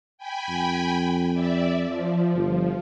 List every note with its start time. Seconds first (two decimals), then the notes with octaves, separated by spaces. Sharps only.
0.18 G5 G#5 B5
0.49 F2
1.33 D5 E5
1.85 F3
2.35 G1